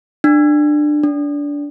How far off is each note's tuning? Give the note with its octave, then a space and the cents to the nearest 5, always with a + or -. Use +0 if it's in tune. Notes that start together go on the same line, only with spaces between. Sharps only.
D4 +20
D4 -20